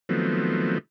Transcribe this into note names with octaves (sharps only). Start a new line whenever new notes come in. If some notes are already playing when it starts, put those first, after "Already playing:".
D#3 F3 F#3 A3 B3 C4